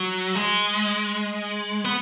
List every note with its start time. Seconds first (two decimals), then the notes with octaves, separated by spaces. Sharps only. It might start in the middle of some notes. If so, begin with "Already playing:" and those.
Already playing: F#3
0.35 G#3
1.84 B3